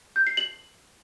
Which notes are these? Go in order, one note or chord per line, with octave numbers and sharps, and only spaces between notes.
G6
C7
F#7